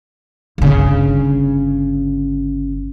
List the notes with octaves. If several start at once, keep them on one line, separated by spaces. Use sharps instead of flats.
G1 C#3